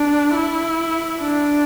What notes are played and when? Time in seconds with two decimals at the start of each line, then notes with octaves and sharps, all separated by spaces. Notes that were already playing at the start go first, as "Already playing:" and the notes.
Already playing: D4
0.36 E4
1.22 D4